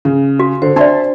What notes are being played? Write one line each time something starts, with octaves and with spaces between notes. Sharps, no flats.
C#3
F#4
D3 C5
D4 D5 E5 A5 C6